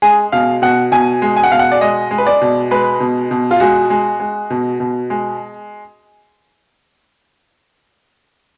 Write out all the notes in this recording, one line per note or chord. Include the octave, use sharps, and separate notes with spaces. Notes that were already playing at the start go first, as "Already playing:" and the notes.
G#3 G#4
B2 F5
B2 F#5
B2 G#5
G#3
G#5
F#5
B2 F5
F#5
D5
G#3 D#5
G#3
B4
D5
B2
G#3 B4
B2
B2
F4
G#3 F#4
G#3
G#3
B2
B2
G#3